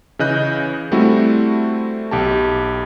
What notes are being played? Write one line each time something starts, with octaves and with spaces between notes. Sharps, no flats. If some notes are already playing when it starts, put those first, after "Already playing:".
C#3 E3 D#5 F#6 G6
G3 A3 C4 E4 F#4
B1 G4 A5